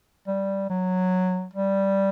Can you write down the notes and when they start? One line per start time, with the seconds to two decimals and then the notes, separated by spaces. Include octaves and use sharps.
0.27 G3
0.69 F#3
1.53 G3